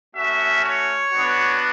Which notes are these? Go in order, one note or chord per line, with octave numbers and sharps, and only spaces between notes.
A3 C#4 F#4 E5
C#5
B3 D4 F#4